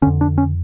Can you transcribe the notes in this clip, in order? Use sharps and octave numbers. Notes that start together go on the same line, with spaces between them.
F2 D3 C#4
D4
C#4